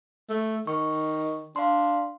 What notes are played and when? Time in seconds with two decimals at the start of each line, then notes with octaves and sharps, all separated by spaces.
0.29 A3
0.67 D#3 C#6
1.56 D4 F5 C6